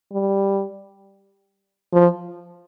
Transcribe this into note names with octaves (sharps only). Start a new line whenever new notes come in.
G3
F3